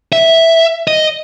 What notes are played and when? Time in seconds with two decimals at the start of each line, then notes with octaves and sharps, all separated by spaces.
0.13 E5
0.88 D#5